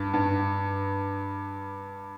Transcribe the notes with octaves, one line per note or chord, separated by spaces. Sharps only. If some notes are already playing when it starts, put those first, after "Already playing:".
Already playing: G2
G2